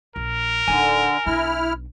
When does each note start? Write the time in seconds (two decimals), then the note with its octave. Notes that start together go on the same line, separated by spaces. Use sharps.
0.16 A#1 A#4
0.68 D1 D3 D#4 G#5
1.26 B1 D4 E4 F6